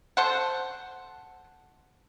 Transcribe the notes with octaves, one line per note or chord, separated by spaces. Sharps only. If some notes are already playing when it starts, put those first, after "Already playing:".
A4 C5 F#5